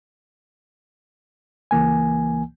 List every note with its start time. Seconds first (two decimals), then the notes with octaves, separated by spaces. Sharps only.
1.71 C#2 E3 A#3 G#5